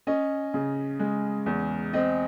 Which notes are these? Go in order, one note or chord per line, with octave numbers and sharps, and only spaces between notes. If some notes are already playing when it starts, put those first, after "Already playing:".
C#4 D#5
C#3
G#3
E2
C4 D#5